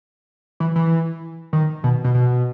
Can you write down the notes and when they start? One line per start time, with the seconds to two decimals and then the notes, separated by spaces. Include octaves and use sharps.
0.60 E3
0.76 E3
1.53 D#3
1.84 B2
2.04 B2
2.15 B2